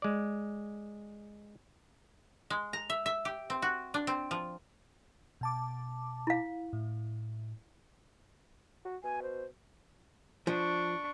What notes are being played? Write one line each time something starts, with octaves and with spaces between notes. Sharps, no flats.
G#3 D5
G#3
A#5
E5
E5
G4
C4
F#4
D4
C4
F3
B2 A5 D6
E4 F5
A2
F#4
B2 G#5
C5
F3 D4 C#6